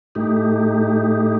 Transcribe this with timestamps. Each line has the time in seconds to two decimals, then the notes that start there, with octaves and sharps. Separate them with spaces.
0.15 A2 A3 D#4 G4